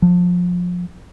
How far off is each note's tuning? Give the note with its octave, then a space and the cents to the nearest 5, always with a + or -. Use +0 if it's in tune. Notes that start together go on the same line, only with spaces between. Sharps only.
F3 +25